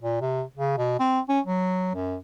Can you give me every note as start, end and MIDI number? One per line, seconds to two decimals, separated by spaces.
0.01 0.19 46
0.21 0.43 48
0.56 0.77 49
0.78 0.96 47
0.99 1.21 60
1.29 1.40 61
1.47 1.95 54
1.95 2.17 42